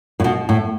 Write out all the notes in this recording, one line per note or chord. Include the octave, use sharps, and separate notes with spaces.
A2
B2
A2